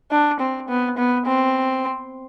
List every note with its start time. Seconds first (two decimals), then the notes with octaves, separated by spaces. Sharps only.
0.11 D4
0.40 C4
0.68 B3
0.97 B3
1.26 C4